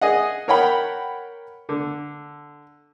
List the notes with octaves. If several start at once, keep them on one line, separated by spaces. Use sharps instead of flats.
G#4 D#5 F#5
A#4 C#5 F#5 G5 B5
D3